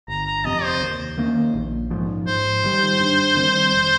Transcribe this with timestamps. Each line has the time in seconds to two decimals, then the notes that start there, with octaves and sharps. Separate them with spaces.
0.08 G1 A#5
0.26 A#5
0.45 F2 C3 D#5
0.63 C5
0.81 D#2
1.18 D#3 A#3 C#4
1.54 A#1
1.91 G#2 F3
2.27 G#2 C5
2.64 D#3 G3
3.00 G2
3.36 D#3 G3 C4
3.73 F1